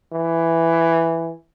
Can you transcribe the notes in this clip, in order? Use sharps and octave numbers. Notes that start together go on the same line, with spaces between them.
E3